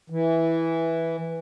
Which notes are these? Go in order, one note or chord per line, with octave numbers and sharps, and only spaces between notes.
E3